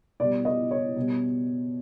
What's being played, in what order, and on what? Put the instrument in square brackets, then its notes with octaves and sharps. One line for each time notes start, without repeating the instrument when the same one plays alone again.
[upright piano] B2 G3 D5
D#5
C#5
B2 G3